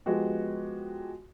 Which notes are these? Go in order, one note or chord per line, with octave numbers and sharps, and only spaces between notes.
F3 G#3 B3 F#4 G4